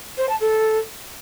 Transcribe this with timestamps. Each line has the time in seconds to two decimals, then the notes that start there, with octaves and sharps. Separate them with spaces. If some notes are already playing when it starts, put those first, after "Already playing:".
0.18 C5
0.29 A5
0.41 A4